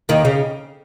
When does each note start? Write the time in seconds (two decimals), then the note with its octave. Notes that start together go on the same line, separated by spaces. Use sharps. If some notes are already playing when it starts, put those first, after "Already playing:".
0.09 D#2 D#3
0.25 C#3